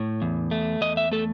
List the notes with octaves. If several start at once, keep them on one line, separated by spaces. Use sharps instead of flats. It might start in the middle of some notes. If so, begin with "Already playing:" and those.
Already playing: A2 C#5
E2
A3
E2 D#5
E5
A3 A4